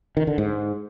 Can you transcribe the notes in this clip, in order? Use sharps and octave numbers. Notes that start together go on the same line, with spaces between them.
D#3
D3
G#2